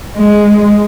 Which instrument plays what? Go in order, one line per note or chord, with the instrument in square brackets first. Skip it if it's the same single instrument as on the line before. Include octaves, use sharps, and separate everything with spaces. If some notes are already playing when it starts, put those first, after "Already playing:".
[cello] G#3